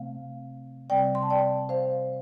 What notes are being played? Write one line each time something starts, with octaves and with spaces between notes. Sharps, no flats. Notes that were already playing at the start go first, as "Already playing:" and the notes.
Already playing: C3 A3 C4 F5
C3 G3 C4 D5 G5
C6
A5
D5 G5
C5 F5